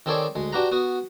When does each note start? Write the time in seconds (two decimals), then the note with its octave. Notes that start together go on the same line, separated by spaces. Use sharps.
0.06 D#3 C4 G#4 A4 C#5 D5
0.35 D2 G#3
0.52 D4 F#4 G4 B4 A#5
0.72 B3 F#4 D#6